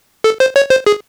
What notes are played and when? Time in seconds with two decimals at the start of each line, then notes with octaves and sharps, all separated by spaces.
0.24 A4
0.40 C5
0.56 C#5
0.70 C5
0.86 G#4